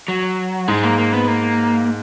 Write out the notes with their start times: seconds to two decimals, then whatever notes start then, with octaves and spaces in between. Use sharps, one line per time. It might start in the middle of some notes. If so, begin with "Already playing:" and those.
0.08 F#3
0.68 G#2 G#3
0.83 A#3
0.98 A#3
1.14 B3
1.28 A#3